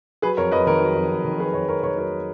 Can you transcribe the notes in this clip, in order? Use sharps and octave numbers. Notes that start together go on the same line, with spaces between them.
F#3 G#4 B4
F2 A#4 C#5
F2 B4 D#5
D#3 A#4 C#5
F#3
F2
F2
D#3
F#3 G#4 B4
F2 A#4 C#5
F2 A#4 C#5
D#3 A#4 C#5
F#3 A#4 C#5